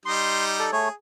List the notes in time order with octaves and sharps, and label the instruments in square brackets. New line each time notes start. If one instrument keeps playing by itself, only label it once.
[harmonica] G3 D#4 D#5 [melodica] C6
[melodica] A4 D5
[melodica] A3 C#5 [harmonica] G#4